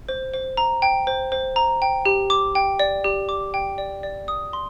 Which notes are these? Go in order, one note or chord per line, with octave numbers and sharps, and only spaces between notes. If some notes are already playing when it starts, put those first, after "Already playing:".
C5
C5
A#5
G5
C5
C5
A#5
G5
G4
D6
G5
D5
G4
D6
G5
D5
D5
D#6
C6